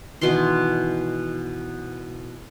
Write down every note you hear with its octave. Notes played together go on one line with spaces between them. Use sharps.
B2 D#3 E3 C6